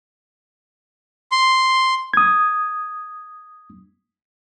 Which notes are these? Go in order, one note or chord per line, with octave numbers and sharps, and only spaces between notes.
C6
D#6 G#6